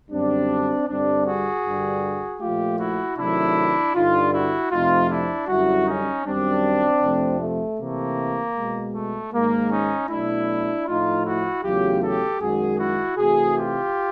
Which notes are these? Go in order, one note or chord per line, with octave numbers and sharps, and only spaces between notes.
F#2 D3 G3 C4 D4
G2 D3 G3 C4 D4
F#4 G#4
G2 D3 G3
A#2 F3 A3 F4 G4
E4 F#4
C3 D#3 F#3 A3 D4 E4
G2 D3 G3 D#4 F4
E4 F#4
F2 C3 F3 A3 D#4 F4
D4 E4
F#2 D3 G3 E4 F#4
C#4 D#4
F#2 D#3 G3 C4 D4
F2 C3 F3 A3
A3
C3 E3 A3 A#3
B2 G#3
A3
G#2 D#3 G#3 A#3
C#4 D#4
B2 F#3 A3 D4 E4
A2 F3 A3 D#4 F4
E4 F#4
E2 C#3 F#3 A3 F4 G4
G4 A4
F#2 D#3 G#3 F#4 G#4
E4 F#4
C3 E3 A3 F#4 G#4
F4 G4